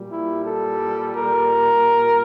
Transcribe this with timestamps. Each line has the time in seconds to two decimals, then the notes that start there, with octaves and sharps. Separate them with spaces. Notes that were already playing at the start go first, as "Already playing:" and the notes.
Already playing: A#2 G3
0.12 E4
0.46 A4
1.15 A#4